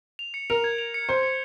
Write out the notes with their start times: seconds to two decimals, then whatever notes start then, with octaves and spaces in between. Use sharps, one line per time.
0.19 F7
0.34 C#7
0.50 A#4 F7
0.64 G#6
0.78 F7
0.94 C#7
1.09 C5 C#7
1.23 C#7